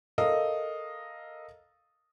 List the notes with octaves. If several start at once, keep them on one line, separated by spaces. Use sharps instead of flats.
A4 A#4 D#5 F5